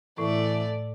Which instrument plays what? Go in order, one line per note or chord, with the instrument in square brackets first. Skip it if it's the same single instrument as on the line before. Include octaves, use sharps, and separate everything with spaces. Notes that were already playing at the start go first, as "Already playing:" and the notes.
[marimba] A2 [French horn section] E3 [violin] A3 D5